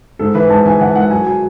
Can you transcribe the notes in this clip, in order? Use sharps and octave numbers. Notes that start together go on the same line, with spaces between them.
G#2 A4
E3 B4
G#2 A5
E3 G#5
E3 F#5
G#2 F#5
F#3 G#5
F#3 G#5